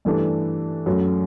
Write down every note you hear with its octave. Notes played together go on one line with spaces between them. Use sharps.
G2 E3 A3 D4 A4
F#2 F#3 A3